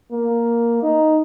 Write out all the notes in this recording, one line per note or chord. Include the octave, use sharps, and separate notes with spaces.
A#3
D#4